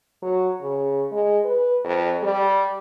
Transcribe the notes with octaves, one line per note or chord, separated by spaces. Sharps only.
F#3
C#3
G#3
B4
F2
G3